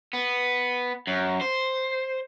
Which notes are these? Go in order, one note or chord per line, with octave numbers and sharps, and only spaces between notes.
B3
F#2
C5